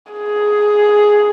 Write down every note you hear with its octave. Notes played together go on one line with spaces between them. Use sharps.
G#4